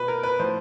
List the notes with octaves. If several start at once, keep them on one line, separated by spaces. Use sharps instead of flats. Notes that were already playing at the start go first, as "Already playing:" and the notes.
Already playing: B2 B4
A#4
B4
A2 F3 C5